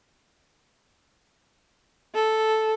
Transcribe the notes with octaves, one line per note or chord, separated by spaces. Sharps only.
A4